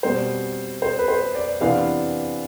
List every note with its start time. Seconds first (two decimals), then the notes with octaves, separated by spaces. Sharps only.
0.03 B2 G3 C4 C5
0.82 C5
0.99 B4
1.08 C5
1.35 D5
1.61 C3 E3 B3 D4 F5